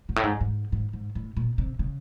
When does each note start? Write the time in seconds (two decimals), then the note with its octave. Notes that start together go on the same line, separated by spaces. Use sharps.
0.09 G#2
0.16 A2
0.23 G#2
0.41 G#2
0.72 G#2
0.93 G#2
1.15 A2
1.37 A#2
1.58 C3
1.79 C#3